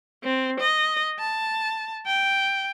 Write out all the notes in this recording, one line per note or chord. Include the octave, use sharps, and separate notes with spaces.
C4
D#5
A5
G5